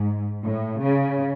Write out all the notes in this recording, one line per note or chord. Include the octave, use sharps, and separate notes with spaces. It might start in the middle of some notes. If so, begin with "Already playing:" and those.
Already playing: G#2
A2
C#3